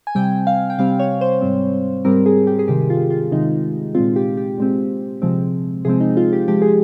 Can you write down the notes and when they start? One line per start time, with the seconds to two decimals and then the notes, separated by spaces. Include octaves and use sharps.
0.07 G#5
0.15 C3 G3 C4 G5
0.47 F5
0.70 G5
0.78 C3 G3 C4 F5
0.99 C#5
1.21 C5
1.41 G#2 G3 C4
2.05 G#2 G3 C4 A#4
2.26 G#4
2.47 G4
2.59 G#4
2.68 C3 D#3 G#3 G4
2.90 F4
3.10 F4
3.32 C3 D#3 G#3 D#4
3.95 A#2 G#3 C4 F4
4.16 G4
4.37 G4
4.58 A#2 G#3 C4
5.22 C3 F3 G#3 C4
5.85 C3 F3 G#3 C4 G#4
6.01 D#4
6.17 F4
6.33 G4
6.48 C3 F3 G#3 G4
6.62 G#4